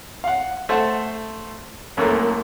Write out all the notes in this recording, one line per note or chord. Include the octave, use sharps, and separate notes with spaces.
F5 F#5
A3 C5 F#5 A5
C2 F#2 A3 A#3 A4